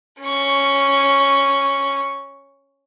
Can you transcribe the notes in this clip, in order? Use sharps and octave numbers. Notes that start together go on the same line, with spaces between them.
C#4 C#6